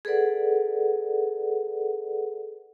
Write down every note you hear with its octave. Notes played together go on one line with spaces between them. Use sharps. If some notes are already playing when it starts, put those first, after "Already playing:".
G#4 A4 B4 D5 F#5